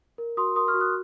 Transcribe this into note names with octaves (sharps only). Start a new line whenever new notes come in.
A#4
F#4 C6 D#6
A#4 C6 D#6
C#6 F6
F#4
D#6 F#6